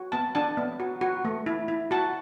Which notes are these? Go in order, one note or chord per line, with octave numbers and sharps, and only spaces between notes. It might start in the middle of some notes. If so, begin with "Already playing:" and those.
Already playing: F#4
B3 A5
D4 A5
B3
F#4
F#4
A3
E4
E4
F#4 A5